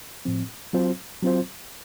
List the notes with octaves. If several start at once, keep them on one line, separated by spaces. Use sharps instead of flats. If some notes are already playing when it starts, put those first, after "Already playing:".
A2 F3 C4
F#3 C4 F4 C5
F#3 C4 F4 C5